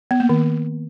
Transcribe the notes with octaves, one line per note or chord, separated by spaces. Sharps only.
B3
A#3
D#3